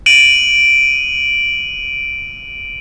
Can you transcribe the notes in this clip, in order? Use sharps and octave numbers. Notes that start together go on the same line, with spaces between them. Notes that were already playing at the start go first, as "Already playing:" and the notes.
D7 D#7 F#7